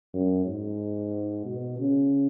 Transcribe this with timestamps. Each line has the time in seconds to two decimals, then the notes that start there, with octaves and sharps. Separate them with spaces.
0.14 F#2
0.46 G#2
1.45 B2
1.79 C#3